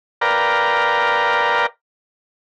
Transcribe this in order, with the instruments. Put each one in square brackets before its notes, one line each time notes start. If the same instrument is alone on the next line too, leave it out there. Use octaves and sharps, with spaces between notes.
[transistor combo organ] A#4 B4 D5 F5 G5 A#5